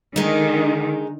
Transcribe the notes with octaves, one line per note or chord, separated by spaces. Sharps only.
D3 D#3 G#3 D#4